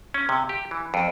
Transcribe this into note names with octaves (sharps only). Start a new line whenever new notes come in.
C#4
C3
G4
E3
F2